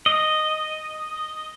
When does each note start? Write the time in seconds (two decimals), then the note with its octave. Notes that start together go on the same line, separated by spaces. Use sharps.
0.06 D#5